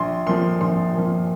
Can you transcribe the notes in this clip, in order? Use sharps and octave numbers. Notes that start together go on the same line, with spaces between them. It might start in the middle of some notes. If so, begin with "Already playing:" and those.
Already playing: A#1 C6
A#2 F3 C6
A#1 C6
A#2 F3